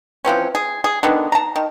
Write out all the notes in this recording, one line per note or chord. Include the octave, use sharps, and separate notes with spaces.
E3 F3 C4 C#4
G#4
G#4
D3 D#3 B3
A5 A#5
D#3